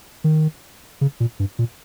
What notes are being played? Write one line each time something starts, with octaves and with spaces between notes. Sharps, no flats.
D#3
C#3
A#2
G2
A#2